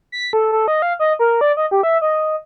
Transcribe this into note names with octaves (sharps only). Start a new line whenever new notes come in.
B6
A4
A4
D#5
F5
D#5
A#4
D5
D#5
G4
E5
D#5